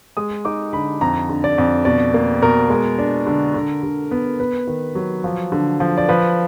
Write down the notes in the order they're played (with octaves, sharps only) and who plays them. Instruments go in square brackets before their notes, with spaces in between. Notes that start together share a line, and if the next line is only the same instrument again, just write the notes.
[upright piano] G#3 D#6
D#4 D6
D3 B5
F2 A#5
D3
D5
F2
B2 D5
A#3
B2 A#4
G#3
D4
D3
D3
D3
B3
B3 B4
D#3
F#3
F3
D3
F3
D5
F3 B4